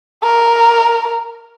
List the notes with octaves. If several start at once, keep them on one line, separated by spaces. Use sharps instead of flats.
A#4